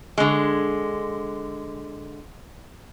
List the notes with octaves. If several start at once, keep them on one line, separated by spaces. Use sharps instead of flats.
D3 G#3